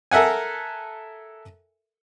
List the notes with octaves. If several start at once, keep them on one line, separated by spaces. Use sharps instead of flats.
A4 A#4 E5 F#5 G#5